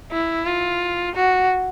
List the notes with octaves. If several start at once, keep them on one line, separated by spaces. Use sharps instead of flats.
E4
F4
F#4